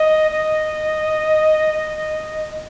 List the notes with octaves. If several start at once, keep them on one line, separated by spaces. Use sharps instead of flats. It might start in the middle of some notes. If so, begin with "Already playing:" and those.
Already playing: D#5
D#5